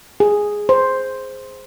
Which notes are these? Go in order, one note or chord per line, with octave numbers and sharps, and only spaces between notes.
G#4
C5